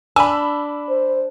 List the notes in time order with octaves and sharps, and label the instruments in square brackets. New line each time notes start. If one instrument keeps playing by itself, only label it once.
[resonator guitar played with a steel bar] D4 [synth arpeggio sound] G#5 [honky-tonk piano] B5 E6
[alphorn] C5